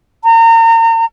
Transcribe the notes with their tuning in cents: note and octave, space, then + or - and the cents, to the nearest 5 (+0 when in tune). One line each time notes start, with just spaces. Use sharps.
A#5 -35